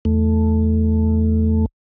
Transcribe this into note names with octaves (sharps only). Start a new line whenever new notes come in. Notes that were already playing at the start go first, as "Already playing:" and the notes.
E2 A3